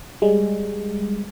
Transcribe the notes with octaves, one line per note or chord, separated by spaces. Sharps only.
G3 G#3